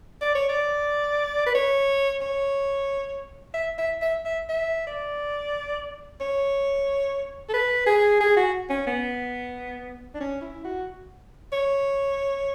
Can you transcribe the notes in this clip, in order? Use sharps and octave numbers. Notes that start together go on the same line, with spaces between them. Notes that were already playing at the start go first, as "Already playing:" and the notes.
D5
C#5
D5
B4
C#5
C#5
E5
E5
E5
E5
E5
D5
C#5
A4
B4
G#4
G#4
F#4
C#4
B3
D4
C#4
E4
F#4
C#5